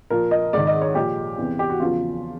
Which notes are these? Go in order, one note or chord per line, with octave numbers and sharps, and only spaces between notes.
A#2 F3 A#4
D#5
G#2 D#3 D5
D#5
C#5
A#2 F3 G4
E2 C3 E3
G4
F#4
E2 C#3 F3 F4